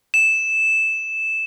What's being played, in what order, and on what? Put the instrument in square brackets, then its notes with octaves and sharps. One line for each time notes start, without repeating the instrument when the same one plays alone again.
[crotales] E7